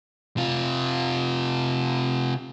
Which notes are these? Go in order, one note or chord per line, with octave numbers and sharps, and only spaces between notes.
C3 F4